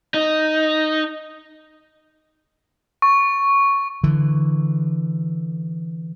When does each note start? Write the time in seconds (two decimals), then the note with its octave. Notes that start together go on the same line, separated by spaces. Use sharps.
0.14 D#4
3.02 C#6
4.04 D3 E3